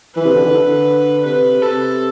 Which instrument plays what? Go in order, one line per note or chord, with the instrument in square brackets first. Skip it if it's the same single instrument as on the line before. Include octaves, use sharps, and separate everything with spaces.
[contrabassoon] E3 [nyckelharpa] B4
[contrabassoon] C3
D3
E3
D3
[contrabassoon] C3 [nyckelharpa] B4
[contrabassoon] C3 [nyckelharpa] A4